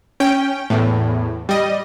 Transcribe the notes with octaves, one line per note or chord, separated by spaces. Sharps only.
C#4 G5
E2 A2
G3 D#5